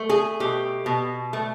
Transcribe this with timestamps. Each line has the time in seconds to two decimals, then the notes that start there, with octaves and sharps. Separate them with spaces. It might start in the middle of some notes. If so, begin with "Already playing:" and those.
Already playing: A3
0.09 G#4
0.40 B2 G4
0.86 B2
1.33 A3